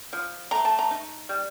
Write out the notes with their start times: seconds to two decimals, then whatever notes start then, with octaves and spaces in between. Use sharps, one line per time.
0.13 F3
0.51 A3 A#5
0.65 A5
0.79 A#5
0.91 D#4
1.29 G3